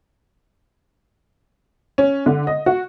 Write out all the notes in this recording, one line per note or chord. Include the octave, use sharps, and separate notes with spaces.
C#4
D3
D#5
F#4